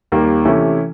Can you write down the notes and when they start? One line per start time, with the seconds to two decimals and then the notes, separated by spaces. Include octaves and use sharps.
0.12 D#2 D#3 G3 A#3
0.45 C3 E3 A3 C#4 E4